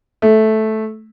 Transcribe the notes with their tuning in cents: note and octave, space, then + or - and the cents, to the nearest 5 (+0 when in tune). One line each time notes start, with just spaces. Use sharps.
A3 -10